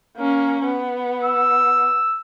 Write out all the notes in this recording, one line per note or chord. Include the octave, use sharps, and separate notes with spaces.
A#3 C#4
B3
E6